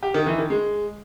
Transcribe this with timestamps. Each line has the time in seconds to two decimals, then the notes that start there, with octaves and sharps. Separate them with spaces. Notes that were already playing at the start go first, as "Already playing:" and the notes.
0.03 G4
0.14 D#3
0.26 E3
0.38 D#3
0.50 G#3